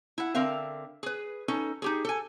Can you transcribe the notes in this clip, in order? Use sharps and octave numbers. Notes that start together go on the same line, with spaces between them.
E4 F#5
D3 C4 A#4 E5 F5
G#4 B4
C#4 D#4 A4
D#4 G4 G#4
A4 G#5